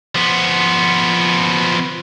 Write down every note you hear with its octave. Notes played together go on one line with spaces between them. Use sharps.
F3 B3